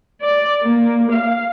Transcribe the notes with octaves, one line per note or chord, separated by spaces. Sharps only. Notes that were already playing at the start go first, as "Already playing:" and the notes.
D5
A#3
F5